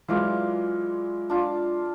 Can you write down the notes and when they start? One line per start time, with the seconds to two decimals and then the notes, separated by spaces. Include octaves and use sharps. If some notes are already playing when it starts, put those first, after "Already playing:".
0.08 E3 F#3 G#3 F4 D5 F5
1.30 D4 F4